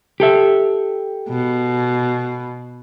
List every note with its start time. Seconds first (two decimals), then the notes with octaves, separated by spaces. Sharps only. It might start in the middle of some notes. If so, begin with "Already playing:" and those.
0.20 G4 A4 E5
1.29 B2